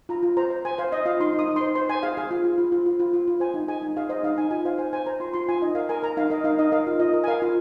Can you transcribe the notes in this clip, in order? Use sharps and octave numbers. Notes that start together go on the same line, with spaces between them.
F4 A#5
F4
C5 A#5
C5
C5 G#5
C5 F5
C5 D#5
F4 F5
D#4 C6
D#4
D#6
D#4
C5 C6
C5 C6
C5 G#5
G#4 F5
G#4 F5
F4
F4
F4
F4
F4
F4
F4
F4
C5 G#5
D#4
G#4 G#5
D#4
G#4 F5
C5 D#5
D#4 F5
D#4 G#5
F4 G#5
C5 F5
C5 G#5
C5 G#5
C5 A#5
F4 C6
F4 C6
F4 G#5
D#4 D#5
A#4 F5
A#4 G#5
A#4 A#5
D#4 F5
A#4 D#5
D#4 F5
D#4 D#5
A#4 F5
F4
F4 D#5
A#4
G#5
A#4 F5
F4